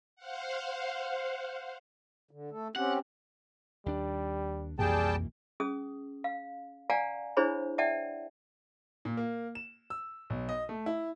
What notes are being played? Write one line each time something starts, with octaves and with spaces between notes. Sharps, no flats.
C5 F5 F#5
D3
A3 A4
C4 C#4 G4 F#5
D#2 G3 D4
B1 F2 E3 G3 A#3 G#4 G5 A5
C#4 G#4 D#6
F5
D5 F5 F#5 G#5 A#5
D4 E4 G#4 C5 C#5 B5
D5 E5 F#5 G5 A5
A#2
A#3
E7
E6
B1
D#5
A3
E4